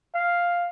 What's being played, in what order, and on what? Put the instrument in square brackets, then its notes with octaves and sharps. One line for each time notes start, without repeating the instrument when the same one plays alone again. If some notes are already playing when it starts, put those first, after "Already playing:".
[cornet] F5